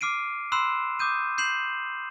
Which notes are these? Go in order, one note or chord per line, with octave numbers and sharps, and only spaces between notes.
D6 F6 C7 D7 D#7
B5 C6 E6 F#6 C7 E7
D6 D#6 G6 D#7
G6 C7 E7 F#7